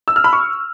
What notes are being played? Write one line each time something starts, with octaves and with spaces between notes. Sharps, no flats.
E6
F6
B5
C#6